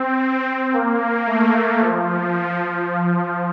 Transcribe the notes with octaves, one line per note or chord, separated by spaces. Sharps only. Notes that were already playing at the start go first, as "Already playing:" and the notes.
Already playing: C4
A#3
A3
F3